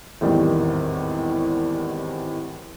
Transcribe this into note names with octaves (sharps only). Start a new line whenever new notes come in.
G#1 E2 A2 D#3 G3